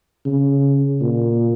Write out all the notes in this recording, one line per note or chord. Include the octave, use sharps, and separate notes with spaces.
C#3
A#2